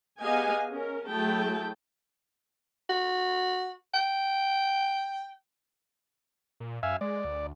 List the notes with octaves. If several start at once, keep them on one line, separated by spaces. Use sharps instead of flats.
B3 G4 G#4 D#5 F5 G#5
C#4 A#4
F#3 A3 E4 G#4 G5 A5
F#4
G5
A#2
F#2 E5 F5 G#5
G#3 D5
D2